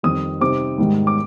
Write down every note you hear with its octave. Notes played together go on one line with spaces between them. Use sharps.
F2 D#3 G3 D#6
C3 G3 C4 D#4 D6
G#2 D#3 G3
D6